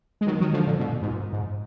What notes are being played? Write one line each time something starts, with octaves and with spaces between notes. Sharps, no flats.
G#3
D#3 F#3
D#3 F#3
D3 F3
A#2 D3
G#2 B2
G#2
A#2
G#2